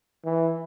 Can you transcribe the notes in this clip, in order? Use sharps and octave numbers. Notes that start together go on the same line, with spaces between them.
E3